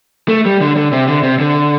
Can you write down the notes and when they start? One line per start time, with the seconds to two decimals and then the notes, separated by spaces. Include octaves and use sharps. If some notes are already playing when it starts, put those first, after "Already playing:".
0.29 A3
0.45 G3
0.61 D3
0.77 D3
0.92 C3
1.08 D3
1.23 C3
1.40 D3